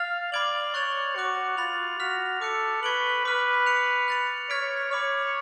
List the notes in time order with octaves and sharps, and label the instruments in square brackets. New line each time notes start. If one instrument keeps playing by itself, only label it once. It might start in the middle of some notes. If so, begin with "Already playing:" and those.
Already playing: [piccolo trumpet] F5 [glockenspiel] F6 A6 F7
[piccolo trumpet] D5 [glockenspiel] B5 D6 G#6 D7 F#7
[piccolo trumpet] C#5 [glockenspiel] C#6 F#6 A6 F7
[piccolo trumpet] F#4 [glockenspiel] D6 F#6 C#7
[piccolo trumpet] F4 [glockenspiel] B5 F#6 A6 F7
[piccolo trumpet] F#4 [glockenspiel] F6 B6 F7
[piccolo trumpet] A4 [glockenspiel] D6 F#6 C#7
[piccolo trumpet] B4 [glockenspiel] C#6 G#6 D7 F#7
[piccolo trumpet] B4 [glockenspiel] B5 D6 F6
[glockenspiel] F#6 C#7 F7
F#6 A6 C#7 F7
[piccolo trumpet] C#5 [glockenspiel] F6 G#6 B6 D7
[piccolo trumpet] C#5 [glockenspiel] B5 D6 F6